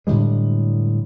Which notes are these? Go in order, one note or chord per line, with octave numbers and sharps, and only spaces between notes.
A2 D3 G3 G#3